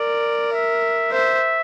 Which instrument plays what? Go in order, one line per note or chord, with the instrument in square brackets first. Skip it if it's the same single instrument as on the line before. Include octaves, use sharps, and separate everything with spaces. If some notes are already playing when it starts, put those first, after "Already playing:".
Already playing: [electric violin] A#4 [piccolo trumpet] D5
[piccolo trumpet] E5
[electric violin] C5 [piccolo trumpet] E5